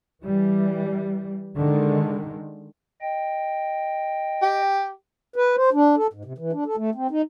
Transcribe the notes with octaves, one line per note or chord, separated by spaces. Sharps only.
E3 G3
D3 D#3 G#3
D#5 G5
G4
B4
C5
D4
A4
G#2
C3
E3
D4
A4
A3
C4
D#4